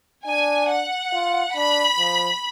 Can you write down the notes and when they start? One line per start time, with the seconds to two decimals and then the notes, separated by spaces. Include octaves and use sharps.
0.26 D4 G#5
0.69 F#5
1.13 F4
1.56 D4 B5
1.99 F3